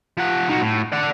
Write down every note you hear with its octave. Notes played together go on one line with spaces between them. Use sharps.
F3 F#5
D#4 F#4
A2
D5 F#5